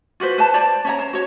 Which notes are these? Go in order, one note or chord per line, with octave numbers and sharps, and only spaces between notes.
F4 F#4 B4 C5
B4 C5 A5
C5 D5 A5
C#4 C#5 A#5
C5
F#4 C#5